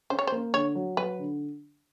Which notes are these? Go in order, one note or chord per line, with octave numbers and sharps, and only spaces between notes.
C#4 C5
C#5
C5
A#3
D3 C#5
F#3
F#3 B4
D3